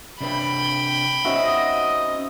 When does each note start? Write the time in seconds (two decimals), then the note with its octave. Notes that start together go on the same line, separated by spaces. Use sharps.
0.21 C3 D4 B4 G5 B5
1.25 C4 C#4 D#4 F#4 D#5 E5